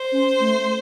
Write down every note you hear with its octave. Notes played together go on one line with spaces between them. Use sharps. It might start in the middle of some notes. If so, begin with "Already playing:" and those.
Already playing: C5
C#4
A3